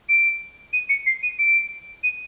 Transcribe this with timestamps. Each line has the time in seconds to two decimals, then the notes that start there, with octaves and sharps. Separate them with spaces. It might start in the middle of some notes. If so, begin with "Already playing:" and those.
0.09 D7
0.73 D#7
0.89 C#7
1.06 C7
1.23 D#7
1.39 D7
2.04 D#7